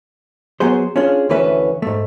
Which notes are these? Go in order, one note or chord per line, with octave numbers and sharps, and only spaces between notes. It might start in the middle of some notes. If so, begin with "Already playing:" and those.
F#3 B3 G#4 C5
C#4 D4 F4 G#4
D2 D3 E3 C#4 B4 E5
G#2 A3